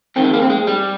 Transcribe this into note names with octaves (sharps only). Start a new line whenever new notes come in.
F2 D#3 C4
G#3
A#3
C4
G#3
G3